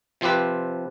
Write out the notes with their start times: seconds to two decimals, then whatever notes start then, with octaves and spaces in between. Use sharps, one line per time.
0.21 C3 F3 C4 G4 B4